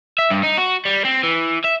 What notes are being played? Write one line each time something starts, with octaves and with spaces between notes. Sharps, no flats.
E5
G2
D#4
F#4
G3
C4
E3
E5